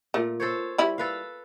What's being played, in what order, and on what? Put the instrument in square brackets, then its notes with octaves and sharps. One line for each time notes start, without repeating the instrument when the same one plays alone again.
[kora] A#2 [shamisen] A3
[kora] A4 C5 C#5
[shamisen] G3 E4
[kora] A4 B4 F5